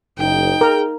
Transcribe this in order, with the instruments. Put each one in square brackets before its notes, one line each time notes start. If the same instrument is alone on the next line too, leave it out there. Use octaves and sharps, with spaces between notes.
[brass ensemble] F#1 [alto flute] D#4 [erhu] G5
[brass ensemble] G#4 [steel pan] A#4